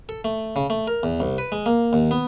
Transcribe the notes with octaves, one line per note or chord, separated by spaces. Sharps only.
A4
A3
C#3
A3
A#4
E2
C2
B4
G#3
A#3
D#2
B3